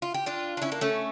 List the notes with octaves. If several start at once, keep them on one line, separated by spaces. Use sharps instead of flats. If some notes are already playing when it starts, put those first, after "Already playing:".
F4
G4
D4 F4
D4
C#4 E4
A#3 D4
A3 C#4